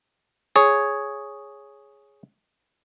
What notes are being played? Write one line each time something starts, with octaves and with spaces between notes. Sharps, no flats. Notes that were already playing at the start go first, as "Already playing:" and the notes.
G#4 C#5